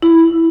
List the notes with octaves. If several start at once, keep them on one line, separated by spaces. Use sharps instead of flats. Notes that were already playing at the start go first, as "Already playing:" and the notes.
E4